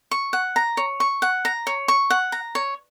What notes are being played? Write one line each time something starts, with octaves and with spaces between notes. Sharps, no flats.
C#6
F#5
A#5
C#5
C#6
F#5
A#5
C#5
C#6
F#5
A#5
C#5